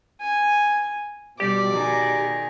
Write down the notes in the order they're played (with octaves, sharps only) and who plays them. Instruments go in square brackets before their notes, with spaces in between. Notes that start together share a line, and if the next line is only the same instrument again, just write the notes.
[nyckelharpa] G#5
[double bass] B2 [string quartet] G3 [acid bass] G4 [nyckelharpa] D5
[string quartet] D#3 G#4